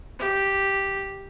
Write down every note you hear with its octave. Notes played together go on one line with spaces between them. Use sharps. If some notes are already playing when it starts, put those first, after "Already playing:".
G4